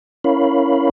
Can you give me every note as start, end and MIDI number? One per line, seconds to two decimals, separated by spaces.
0.24 0.89 61
0.24 0.89 64
0.24 0.89 70
0.24 0.89 73
0.24 0.89 77
0.24 0.89 83